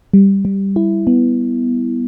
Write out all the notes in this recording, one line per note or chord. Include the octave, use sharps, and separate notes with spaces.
G3
G3
E4
B3